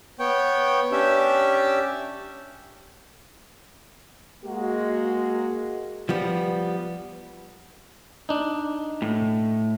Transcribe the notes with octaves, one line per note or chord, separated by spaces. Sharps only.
B3 C#5 G5
C#4 D4 G4 E5
G#3 A#3 F#4
F3 G3 B3
D4 D#4
A2